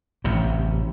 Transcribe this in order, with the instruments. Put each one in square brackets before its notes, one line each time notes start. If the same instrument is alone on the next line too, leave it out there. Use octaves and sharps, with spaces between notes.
[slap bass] A1 C3